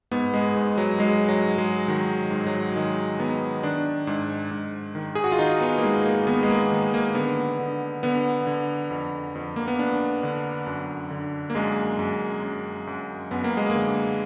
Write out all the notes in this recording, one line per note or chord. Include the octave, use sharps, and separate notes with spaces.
G#2 B3
G#3
G#2
F#3
G#2 G#3
F#3
G#2
G#3
D#3 F#3
G#2
F#3
D#3 G#3
D#3 B3
D#3 D4
G#2
G#2
D#3
G#4
F#4
F4
D#3 D#4
B3
A#3
G#2 G#3
A#3
D#3 B3
G#3
A#3
D#3
A#3
D3 B3
D3
D3 B3
D3
F2
F2
A#3
B3
F2 D4
D3
F#2
D3
A#3
F#2 G#3
F#2
F#2
F#2
F#2 B3
A#3
G#3
A#3
D3